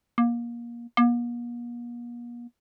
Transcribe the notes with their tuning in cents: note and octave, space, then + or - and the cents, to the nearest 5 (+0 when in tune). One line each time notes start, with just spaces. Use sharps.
A#3 +25
A#3 +45